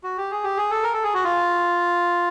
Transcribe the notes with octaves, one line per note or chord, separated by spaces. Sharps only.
F#4
G4
G#4
G4
G#4
A4
A#4
A4
G#4
F#4
F4